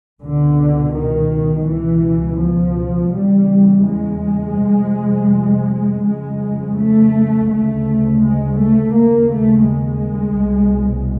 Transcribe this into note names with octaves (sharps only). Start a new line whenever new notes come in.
C#2 B2 D3
D#3
C#2 B2 E3
F3
E2 C#3 G3
G#3
F2 C3
F2 C#3 G#3
A3
D2 C#3 A3
G#3
A3
D#2 C#3 A#3
A3
G#3
C2 B2